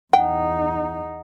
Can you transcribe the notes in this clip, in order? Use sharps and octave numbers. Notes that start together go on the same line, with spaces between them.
E2 D#4 F#5 G5